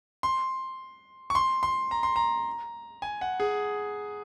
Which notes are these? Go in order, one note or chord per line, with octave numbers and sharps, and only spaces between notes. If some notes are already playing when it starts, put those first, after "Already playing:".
C6
C#6
C6
C6
A#5
C6
A#5
G#5
F#5
G#4